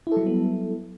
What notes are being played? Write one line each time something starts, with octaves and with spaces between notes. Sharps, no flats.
F#3 G3 B3 E4 A4